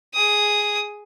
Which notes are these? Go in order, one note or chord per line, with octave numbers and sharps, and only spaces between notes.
G#4 D#6